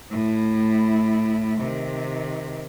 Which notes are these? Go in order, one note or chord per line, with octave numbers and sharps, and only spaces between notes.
A2 E4
C3 D#3